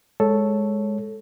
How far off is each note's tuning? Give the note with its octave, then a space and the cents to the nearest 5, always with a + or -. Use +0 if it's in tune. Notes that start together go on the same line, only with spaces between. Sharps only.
G#3 +0 A4 +0 C#5 +0